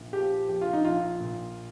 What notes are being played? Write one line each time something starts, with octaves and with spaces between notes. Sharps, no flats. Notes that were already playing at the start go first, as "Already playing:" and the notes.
Already playing: A#1 A#2
F3 G4
A#1 G4
F4
D#4
A#1 F4
A#2